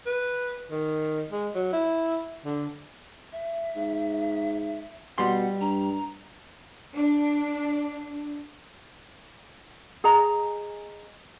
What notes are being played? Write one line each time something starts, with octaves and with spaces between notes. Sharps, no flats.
B4
D#3
G#3
F#3
E4
D3
E5
G#2
B2 G3 F#5 C6
G2 A#5
D4
G#4 D#5 A#5